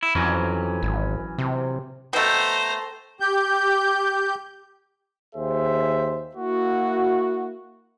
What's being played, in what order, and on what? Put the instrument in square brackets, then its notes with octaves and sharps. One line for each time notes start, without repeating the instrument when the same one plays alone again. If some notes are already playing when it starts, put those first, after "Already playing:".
[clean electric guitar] E4
[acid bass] F2 [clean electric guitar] E3 F#3 C#4
[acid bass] G#1
C3
[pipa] B2 A3 [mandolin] A4 G5 [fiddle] C5 A#5
[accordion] G4 G6
[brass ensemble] D#2 G#4 C5 E5
A#3 E4 F#4